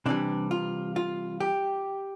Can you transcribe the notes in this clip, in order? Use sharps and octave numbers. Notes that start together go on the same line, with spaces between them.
C3 E3 G3 D4
F4
F4
G4